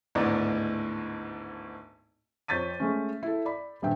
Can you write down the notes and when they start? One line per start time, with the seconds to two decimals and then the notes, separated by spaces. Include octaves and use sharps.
0.15 G#1 D2 A2 B3 D5 D#5
2.48 F2 C#5 G6 A6 B6 D#7
2.80 G#3 A3 C#4
3.23 E4 A4
3.45 D5 B5
3.82 D#1 G2 E5 G5